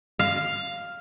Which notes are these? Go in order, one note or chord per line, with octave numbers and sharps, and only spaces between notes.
F5